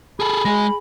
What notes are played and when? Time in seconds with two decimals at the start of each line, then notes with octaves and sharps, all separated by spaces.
0.20 G#4 A4 B5
0.45 G#3 G#4 G#5 A#6